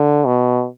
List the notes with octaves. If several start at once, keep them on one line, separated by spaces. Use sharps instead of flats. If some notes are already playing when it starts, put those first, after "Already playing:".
Already playing: D3
B2